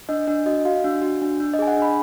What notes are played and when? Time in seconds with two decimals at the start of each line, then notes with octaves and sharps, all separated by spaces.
0.09 D4 D#5
0.27 D4
0.46 F#4 D#5
0.65 F#4 F5
0.84 D4
1.02 F#4
1.22 D4
1.40 D4
1.54 D#5
1.59 G#4 G#5
1.67 F#5
1.77 D4
1.82 B5